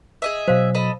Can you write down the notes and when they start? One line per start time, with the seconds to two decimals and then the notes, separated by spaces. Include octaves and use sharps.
0.22 G#4 D#5 E5
0.48 B2 F#3 C5 F5
0.74 A4 D#5 B5